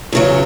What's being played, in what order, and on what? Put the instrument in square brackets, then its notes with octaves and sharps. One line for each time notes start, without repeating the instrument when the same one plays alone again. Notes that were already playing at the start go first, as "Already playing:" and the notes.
[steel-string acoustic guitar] E2 C#3 F#3